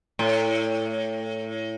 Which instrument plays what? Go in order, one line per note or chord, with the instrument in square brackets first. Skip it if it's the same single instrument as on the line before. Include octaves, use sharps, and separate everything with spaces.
[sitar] A2